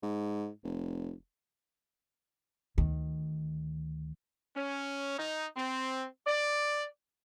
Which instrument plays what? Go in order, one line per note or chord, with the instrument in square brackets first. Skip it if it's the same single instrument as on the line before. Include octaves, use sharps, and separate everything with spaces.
[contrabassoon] G#2
F1
[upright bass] D2 D#3
[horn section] C#4
D#4
C4
D5